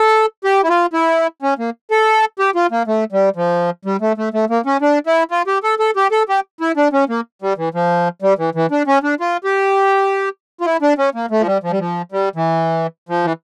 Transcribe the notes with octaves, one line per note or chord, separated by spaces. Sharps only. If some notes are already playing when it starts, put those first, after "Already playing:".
Already playing: A4
G4
E4
F4
E4
C#4
A#3
A4
G4
F4
A#3
A3
G3
F3
G3
A3
A3
A3
A#3
C#4
D4
E4
F4
G4
A4
A4
G4
A4
G4
E4
D4
C#4
A#3
G3
E3
F3
G3
E3
E3
D4
C#4
D4
F4
G4
F4
E4
D4
C#4
A#3
A3
F3
G3
F3
G3
F3
G3
E3
F3
E3